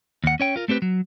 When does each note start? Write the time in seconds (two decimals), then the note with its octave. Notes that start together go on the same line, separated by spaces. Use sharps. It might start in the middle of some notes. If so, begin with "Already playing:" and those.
0.24 D#2 F#5
0.40 C#4 C#5 G5
0.56 F4 A#4
0.68 A3 C4 G4 B4
0.82 F#3